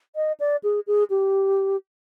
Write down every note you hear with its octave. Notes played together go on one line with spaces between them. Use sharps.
D#5
D5
G#4
G#4
G4